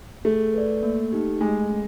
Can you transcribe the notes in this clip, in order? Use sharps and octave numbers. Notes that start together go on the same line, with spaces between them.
A3 G#4
B4 D5
A#3
D#4 G4
G#3 A3
C#4